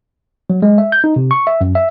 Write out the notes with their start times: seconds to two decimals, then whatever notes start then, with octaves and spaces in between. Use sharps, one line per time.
0.50 F#3
0.62 G#3
0.78 E5
0.92 G6
1.04 D#4
1.16 C3
1.31 C#6
1.47 E5
1.61 F#2
1.75 E5